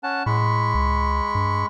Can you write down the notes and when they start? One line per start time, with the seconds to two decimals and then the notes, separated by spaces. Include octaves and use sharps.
0.03 C#4 F#5 A5
0.26 A2 G#3 B5 C#6
0.75 C#2
1.35 G2